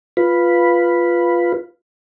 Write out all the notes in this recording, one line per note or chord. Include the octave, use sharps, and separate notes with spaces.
F4 B4